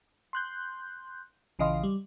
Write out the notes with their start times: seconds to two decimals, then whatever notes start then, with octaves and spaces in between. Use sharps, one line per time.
0.33 C6 F#6 G6
1.59 A#1 C#3 E3 D#5 F5 C6
1.83 G3